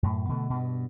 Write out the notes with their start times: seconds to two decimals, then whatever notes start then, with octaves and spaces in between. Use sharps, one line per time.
0.03 F#2 A2
0.29 B2 D3 E3 A3
0.50 G2 B2